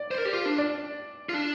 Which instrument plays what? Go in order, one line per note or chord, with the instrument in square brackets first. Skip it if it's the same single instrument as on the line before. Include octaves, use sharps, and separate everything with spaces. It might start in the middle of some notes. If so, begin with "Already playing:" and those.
Already playing: [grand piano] D5
[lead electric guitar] C5
A#4
G4
F4
D4
[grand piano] D5
[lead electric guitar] F4
D4